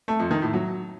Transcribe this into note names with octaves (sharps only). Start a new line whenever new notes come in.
A3
F2
D#3
A2
F#3